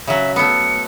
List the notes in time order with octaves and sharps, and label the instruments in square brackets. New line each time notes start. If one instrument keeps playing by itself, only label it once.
[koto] C#3 F#3 [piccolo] E5
[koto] A3 B3 [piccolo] C#7